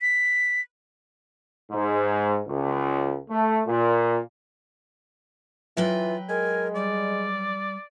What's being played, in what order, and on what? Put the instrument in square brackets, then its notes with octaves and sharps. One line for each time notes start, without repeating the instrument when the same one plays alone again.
[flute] B6
[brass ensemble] G#2
C#2
A3
A#2
[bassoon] E3 [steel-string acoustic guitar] F#3 B4 G5 [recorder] F4
[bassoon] G#3 [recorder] A#4 [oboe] G#5
[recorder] G3 [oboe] D5